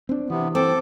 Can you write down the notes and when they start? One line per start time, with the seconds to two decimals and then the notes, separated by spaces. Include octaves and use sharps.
0.09 C4 D4
0.30 C3 E3 B3
0.55 C4 A4 D6